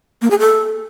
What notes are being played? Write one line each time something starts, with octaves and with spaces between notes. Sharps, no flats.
A#3
G#4
A4